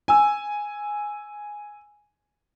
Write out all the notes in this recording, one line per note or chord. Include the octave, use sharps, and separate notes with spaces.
G#5 E6